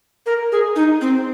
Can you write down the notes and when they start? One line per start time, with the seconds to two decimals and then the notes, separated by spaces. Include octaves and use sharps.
0.26 A#4
0.52 G#4
0.76 D#4
1.01 C4